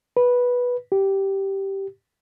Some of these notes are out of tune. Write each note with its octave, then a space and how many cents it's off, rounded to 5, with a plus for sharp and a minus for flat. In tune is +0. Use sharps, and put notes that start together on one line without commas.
B4 -10
G4 -10